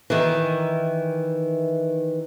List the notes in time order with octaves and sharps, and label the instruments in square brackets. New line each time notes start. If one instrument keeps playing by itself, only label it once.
[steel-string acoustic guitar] D#3 E3